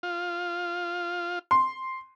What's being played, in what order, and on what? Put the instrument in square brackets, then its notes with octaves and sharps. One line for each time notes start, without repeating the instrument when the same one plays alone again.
[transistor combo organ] F4
[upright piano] C6